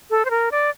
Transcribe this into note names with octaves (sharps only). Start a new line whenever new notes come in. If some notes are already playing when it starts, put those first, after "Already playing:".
A4
C5
A#4
D5